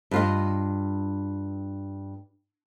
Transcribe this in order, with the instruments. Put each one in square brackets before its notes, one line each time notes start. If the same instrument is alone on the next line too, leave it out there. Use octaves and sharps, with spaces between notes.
[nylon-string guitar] G2 F4 D#5